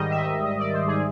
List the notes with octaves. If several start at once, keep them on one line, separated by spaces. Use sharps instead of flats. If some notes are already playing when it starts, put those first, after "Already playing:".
Already playing: G#2 D#3 G3 D#5
E5
D#5
D#5
D5
C5
G#4